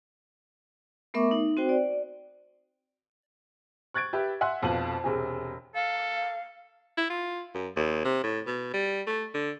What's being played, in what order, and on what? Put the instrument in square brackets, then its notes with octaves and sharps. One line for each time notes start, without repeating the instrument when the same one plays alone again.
[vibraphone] A3 B3 A#4 E5 C#6 D6
D#4
C4 F#4 C5 G5
D5
[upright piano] C#6 F#6 G#6 A6 D7
G4 B4 E5
E5 F#5 G#5 C6 F#6
F1 F2 B2 F4 D#7 F#7
E1 C3 G#4
[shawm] A4 [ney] F5
[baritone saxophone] E4
F4
F#2
D#2
C3
A2
B2
G3
A3
D3